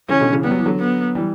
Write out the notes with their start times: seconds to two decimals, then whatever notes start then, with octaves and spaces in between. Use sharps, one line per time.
0.09 C#3 E3 C#4
0.20 B2 D3
0.32 C#3 E3
0.44 G3 B3
0.51 F#3
0.58 E3
0.66 D3 F#3
0.79 B3
1.15 E3 G3